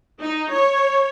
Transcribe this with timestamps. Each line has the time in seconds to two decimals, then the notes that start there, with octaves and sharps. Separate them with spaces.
0.20 D#4
0.52 C#5